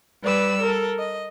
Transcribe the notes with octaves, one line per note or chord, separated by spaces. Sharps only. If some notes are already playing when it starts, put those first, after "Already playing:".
G3 B4 D5 E6
A4 A#4
D#5